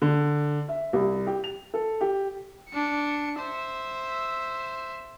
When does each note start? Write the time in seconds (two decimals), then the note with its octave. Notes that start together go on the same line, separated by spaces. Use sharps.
0.02 D3
0.69 E5
0.93 C2
1.27 G4
1.44 F7
1.74 A4
2.01 G4
2.70 D4 C#7
3.40 C5 E5